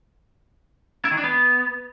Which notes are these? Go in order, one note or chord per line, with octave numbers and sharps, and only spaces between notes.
E4
D#3
D4
B3